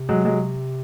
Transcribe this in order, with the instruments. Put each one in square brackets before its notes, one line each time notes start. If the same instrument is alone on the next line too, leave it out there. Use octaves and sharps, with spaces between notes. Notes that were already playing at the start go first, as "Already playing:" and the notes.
Already playing: [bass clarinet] C3
[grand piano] F#3 G#3
F#3 G#3